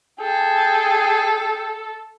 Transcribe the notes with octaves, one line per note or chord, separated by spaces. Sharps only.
G#4 A4 G5